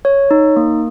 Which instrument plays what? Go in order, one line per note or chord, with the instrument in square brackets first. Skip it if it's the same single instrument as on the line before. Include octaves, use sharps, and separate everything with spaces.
[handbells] C#5
D#4
A#3